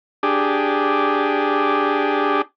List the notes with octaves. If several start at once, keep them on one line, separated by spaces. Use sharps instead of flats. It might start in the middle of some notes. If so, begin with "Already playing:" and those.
D4 G4 G#4